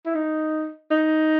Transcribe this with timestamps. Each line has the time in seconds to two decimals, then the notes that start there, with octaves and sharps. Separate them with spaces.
0.06 E4
0.15 D#4
0.91 D#4